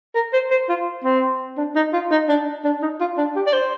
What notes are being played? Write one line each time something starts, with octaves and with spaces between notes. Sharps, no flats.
A#4
C5
C5
F4
C4
D4
D#4
F4
D#4
D4
D4
D#4
F4
D4
G4
D5
C5